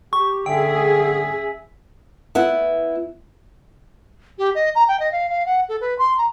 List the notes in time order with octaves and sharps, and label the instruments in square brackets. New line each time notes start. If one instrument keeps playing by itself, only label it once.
[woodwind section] G4 [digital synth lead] C#6
[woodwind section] D3 [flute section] C#4 E5 E6 [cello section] G#4 [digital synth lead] G5
[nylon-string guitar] B3 E4 F#5
[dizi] G4
D#5
A#5
G5
D#5
F5
F5
F#5
A4
B4
C6
A#5